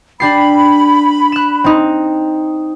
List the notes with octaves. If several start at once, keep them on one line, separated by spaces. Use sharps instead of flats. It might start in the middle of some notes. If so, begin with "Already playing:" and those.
D4 G4 B5 C7
F#6 E7
C4 D#4